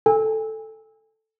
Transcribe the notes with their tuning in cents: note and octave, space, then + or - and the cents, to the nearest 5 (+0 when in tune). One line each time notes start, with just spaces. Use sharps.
A4 +0 G#5 -35